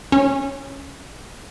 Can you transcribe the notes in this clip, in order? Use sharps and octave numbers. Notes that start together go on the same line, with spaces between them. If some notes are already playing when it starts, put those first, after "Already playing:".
C#4